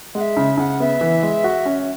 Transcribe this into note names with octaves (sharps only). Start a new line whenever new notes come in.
G#3 E5 F#5
C#3
C#3 F#5
B3 E5
E3
G#3
F#4
C#4